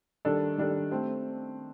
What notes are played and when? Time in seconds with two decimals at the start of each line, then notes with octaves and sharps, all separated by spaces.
0.25 D#3 G3 D4 A4
0.58 D#3 G3 D4 A4
0.91 A3 C4 G4